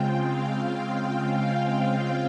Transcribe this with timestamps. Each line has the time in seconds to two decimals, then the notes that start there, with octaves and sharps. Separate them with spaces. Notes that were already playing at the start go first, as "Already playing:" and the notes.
Already playing: C#3 G#3 C4 F4 G5
0.25 F5